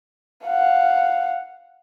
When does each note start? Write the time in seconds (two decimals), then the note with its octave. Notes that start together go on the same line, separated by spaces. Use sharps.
0.46 F5 F#5